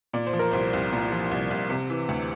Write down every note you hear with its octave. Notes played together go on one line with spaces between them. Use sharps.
A#2 D5
C5
F3
A#4
C2 C5
C2
A#2
F3
C2
C2
C3
E3
D2